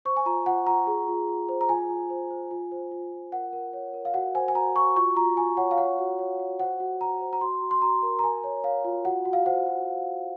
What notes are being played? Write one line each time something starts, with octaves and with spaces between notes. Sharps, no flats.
C5 C#6
G#5
F4 A#5
F4 F#5
F4 A#5
G#4
F4
F4
C5
A#5
F4 G#5
F4
C5
C5
F4
C5
F4
F4
A#4 F#5
A#4
C#5
A#4
F5
F#4 F#5
C5 G#5
G#5
F#4 A#5
F#4 C#6
F4 C#6
F4 A#5
F4 G#5
C#5 F#5
F5
C#5 F#5
F#4
C#5
F#4
C5 F#5
F#4
F#4 A#5
C5
A#5
F#4 C6
F#4
C6
F#4 A#5
A#4
A#5
A#4 G#5
C#5
C#5 F5
F4
F#4 F#5
F#4
F5
C5 F#5
F#4